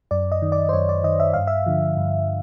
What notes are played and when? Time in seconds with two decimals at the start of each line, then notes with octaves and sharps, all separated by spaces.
0.11 F#2 D5
0.32 D#5
0.42 D#3
0.52 D5
0.69 C5
0.73 F#2 C#5
0.89 D5
1.04 D#3 D#5
1.20 E5
1.34 G2 F5
1.47 E5
1.66 D3 F3
1.97 G2